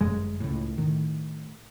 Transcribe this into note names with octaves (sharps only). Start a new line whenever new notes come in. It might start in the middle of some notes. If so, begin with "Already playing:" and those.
G1 F#2 G#3
C#2 A2
A2 D#3